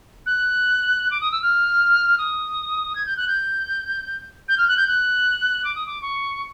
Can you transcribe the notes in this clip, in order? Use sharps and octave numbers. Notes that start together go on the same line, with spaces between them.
F#6
D6
D#6
E6
F6
D#6
G#6
G6
F#6
G6
G6
F6
F#6
G6
F#6
D6
D#6
D6
C#6